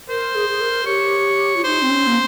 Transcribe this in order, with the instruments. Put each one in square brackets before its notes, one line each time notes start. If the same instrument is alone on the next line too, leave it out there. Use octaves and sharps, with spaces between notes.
[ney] A#4 [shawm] C5
[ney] G#4
G#4
A#4
[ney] G4 [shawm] C#5
[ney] F4
[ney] D#4 [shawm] C5
[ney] C4
C#4
A#3